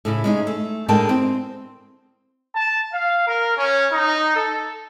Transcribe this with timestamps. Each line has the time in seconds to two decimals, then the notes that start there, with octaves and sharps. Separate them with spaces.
0.05 A2 C#3 E4
0.24 G#3 C#4 D#4
0.47 A3
0.88 A2 D3 G#3 A#4 G5 A5
1.09 C4
2.55 A5
2.93 F5
3.26 A#4
3.56 C#4
3.92 D#4
4.36 A4